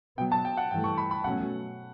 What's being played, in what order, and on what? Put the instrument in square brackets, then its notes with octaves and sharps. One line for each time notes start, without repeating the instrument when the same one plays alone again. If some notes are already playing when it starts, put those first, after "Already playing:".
[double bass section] B2 F#3 B3 [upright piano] G5
[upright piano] A5
G5
F#5
[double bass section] G2 E3 A3 [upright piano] G5
[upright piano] C#6
B5
B5
[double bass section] B2 F#3 A3 C#4 [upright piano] F#5